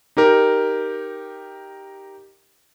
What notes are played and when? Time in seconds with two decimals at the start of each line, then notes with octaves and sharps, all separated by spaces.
0.17 D#4 G4 A#4